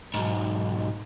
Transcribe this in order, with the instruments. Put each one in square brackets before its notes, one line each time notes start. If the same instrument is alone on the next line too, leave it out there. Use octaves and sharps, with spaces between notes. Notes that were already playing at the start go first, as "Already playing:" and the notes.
[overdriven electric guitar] B1 G#2